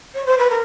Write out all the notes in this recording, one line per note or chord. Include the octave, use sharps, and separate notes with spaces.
C#5
C5
B4
A#4